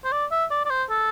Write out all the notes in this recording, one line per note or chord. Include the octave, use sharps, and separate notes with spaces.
C5
D5
E5
D5
D5
C5
A4